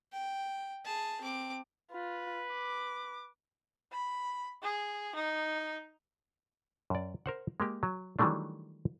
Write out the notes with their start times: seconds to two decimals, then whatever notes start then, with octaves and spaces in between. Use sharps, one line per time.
0.12 G5
0.85 G#4 A5
1.21 C4 D6
1.91 F4 B4
2.53 D6
3.92 B5
4.63 G#4
5.15 D#4
6.90 F#2 D5
7.26 A#4 C5 F#5
7.60 G#3 A#3 G4
7.83 F#3
8.19 D#3 E3 F#3 G3 A3 D4